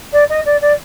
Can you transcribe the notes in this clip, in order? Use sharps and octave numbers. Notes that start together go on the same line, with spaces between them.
D5
D#5
D5
D5